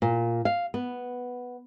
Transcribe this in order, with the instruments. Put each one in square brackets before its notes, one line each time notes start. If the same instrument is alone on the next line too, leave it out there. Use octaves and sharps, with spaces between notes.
[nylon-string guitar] A#2
F5
B3